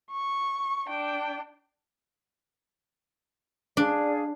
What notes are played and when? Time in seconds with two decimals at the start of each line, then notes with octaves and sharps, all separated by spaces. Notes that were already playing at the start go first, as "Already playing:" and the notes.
0.11 C#6
0.89 D4 G5
3.77 D4 G#4 D5 F5